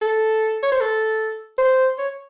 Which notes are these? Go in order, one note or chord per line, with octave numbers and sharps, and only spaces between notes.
A4
C#5
C5
A4
C5
C#5